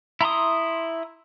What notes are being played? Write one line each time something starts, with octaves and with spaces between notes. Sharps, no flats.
E4 A#5 C6 D#6